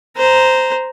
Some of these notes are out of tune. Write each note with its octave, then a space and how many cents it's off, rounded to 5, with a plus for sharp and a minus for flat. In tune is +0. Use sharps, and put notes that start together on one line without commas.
C5 -10 A#5 +0